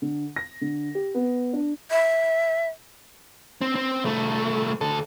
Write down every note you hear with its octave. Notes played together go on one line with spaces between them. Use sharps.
D3
A#6
D3
G4
B3
D4
E5
C4
C4
C2 A3
D2 A4